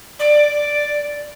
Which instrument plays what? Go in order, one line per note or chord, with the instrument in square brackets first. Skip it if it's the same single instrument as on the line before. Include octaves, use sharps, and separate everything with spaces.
[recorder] D5